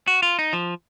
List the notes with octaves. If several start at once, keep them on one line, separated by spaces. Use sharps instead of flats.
F#4
F4
D#4
F3